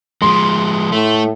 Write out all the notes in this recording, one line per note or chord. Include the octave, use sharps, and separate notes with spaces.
F3 G#3 C6
A2 A3